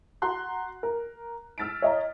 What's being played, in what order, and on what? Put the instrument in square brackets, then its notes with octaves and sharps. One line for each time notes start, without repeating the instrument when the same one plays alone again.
[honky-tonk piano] F#4 A#5 C6 F#6
A#4
E6 F6 A6 B6 D7
C#5 D#5 A#5